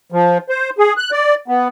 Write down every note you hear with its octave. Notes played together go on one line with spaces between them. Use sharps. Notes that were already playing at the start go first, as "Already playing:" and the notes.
F3
C5
G#4
F#6
D5
B3